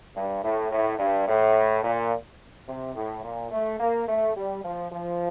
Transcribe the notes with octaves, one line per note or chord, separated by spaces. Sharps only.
G2
A2
A2
G2
A2
A#2
C3
A2
A#2
A3
A#3
A3
G3
F3
F3